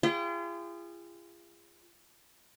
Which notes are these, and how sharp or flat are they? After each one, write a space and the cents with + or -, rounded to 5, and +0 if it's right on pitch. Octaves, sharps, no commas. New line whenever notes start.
F4 -40 G#4 -30 G5 -20